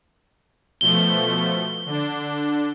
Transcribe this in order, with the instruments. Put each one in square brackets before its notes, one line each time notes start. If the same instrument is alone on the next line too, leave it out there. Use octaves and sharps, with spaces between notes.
[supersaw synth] B2 F3 A3 [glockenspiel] G7
[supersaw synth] D3 D4